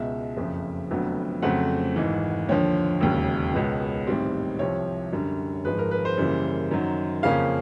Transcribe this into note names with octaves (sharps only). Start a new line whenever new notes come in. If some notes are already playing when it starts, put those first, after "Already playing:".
Already playing: C#2 B2 G#3 E5
F#1 F2 C#3 F3
F1 F2 D3 F#3 B3
F2 C#3 F#3 A3 C4 F#5
G#1 G#2 E3
D#2 D3 F3 C#5
E1 D#2 C#3
C#2 B2 G#3 B3
A1 G#2 D#3 G3 C4
C2 C3 F3 C#5
F#2 D3 G3
G#1 G#2 F3 G#3 B4
A#4
B4
C5
F#2 C#3 E3 G3 A#3
F#2 D#3 F#3
F2 C#3 F3 A#3 C#4 F5